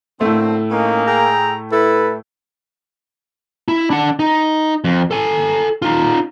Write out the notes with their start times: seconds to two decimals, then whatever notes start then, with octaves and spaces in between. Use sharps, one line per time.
0.21 A2 D3 A3 A#3 C4
0.71 A#3 C#4 D#4
1.07 G#4 G5 A#5
1.72 E4 A4 B4
3.68 E4
3.90 D4 F#5
4.19 D#4
4.84 F2
5.11 A4 G#5
5.82 D#4 F4